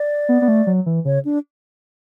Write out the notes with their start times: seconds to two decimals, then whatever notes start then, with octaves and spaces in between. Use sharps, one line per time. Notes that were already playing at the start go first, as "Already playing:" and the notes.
Already playing: D5
0.29 B3
0.42 B3
0.48 A3
0.67 F#3
0.86 E3
1.05 C#3 C#5
1.25 D4